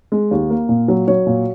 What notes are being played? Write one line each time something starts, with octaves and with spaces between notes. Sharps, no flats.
G#3
D#2
A#3
A#2
F#3
F#3 C#5
A#2